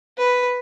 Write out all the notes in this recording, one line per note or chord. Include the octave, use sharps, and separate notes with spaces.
B4